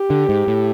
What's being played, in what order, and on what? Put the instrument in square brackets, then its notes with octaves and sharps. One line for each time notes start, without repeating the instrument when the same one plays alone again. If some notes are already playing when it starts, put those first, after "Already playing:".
Already playing: [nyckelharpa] G4
[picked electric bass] D3
G#2
A2